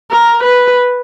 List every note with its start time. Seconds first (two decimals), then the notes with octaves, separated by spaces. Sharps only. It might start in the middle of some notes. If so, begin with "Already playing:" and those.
0.11 A#4
0.43 B4